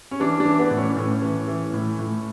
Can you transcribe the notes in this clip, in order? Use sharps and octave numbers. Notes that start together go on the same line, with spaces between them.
C#4
E3 D4
D4
E3
B3
A2
C#4
A2 C#4
E3
E3
A2
A2